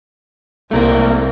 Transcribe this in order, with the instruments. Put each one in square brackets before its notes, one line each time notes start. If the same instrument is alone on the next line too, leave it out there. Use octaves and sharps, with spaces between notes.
[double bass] C2 [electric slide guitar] A3 A#3 A#4